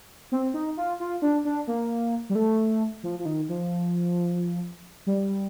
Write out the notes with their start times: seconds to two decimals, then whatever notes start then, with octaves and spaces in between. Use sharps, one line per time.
0.32 C4
0.54 D#4
0.77 F4
1.00 F4
1.22 D4
1.45 D4
1.67 A#3
2.30 G3
2.35 A3
3.03 F3
3.19 F3
3.26 D#3
3.49 F3
5.07 G3